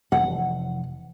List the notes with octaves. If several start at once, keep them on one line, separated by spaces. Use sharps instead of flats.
F1 E3 F#5